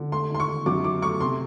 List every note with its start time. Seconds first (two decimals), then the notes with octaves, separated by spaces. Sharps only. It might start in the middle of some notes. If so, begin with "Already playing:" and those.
Already playing: D3
0.12 A3 C6
0.30 D#3 C6
0.40 C#6
0.48 D#3
0.66 F#2 D6
0.84 D#3 D6
1.02 A3 C#6
1.20 C3 C6